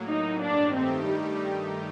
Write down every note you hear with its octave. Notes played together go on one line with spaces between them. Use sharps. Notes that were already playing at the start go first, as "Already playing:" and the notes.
Already playing: A2 F#3 A#3
D#4
G2 D#3 A3 D4 D#4 G4
C4
G3